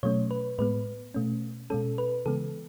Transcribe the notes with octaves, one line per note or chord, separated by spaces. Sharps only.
B2 F#3 A3 C#4 C#5
B4
A2 G#3 B3 B4
B2 A3 C#4
B2 G#3 C#4 A4
B4
C#3 E3 G#3 B3 A4